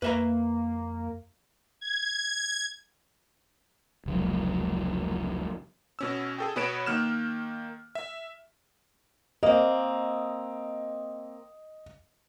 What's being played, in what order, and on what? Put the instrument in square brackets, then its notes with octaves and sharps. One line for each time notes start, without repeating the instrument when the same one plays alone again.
[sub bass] F2 [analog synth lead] A#3 [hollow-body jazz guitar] B4 E5 A#5
[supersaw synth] G#6
[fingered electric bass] F1 C#2 F#3
[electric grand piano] B2 C#4 E6
G#4 A4 G5
B2 B3 B4 C#5 D7 E7
D#3 A#3 F6 F#6 E7
E5
[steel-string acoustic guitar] A#3 C4 [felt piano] D#5